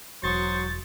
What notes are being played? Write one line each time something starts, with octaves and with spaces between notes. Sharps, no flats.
E1 F#3 C5 C#6 D#6 A6